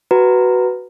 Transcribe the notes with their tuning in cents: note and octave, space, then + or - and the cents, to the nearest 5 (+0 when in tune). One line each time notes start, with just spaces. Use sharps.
F#4 +10 B4 +0 A#5 -15